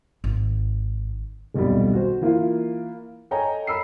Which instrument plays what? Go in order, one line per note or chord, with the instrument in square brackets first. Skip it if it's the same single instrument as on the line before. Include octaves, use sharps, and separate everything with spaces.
[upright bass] G#1
[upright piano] D#1 B1 F2 G3
F#4 C5
E3 A#3 E4 F4
A4 C#5 D#5 G5 G#5 A#5
B5 E6 C7